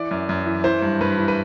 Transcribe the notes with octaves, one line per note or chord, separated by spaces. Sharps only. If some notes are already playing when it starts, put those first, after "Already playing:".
Already playing: E3 D5
F#2
F#2
E3
E3 C5
G2
G2 B4
E3
B4